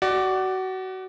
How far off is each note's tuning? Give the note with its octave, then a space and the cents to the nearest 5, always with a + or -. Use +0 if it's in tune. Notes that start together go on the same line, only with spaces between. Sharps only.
F#4 +25 D5 +0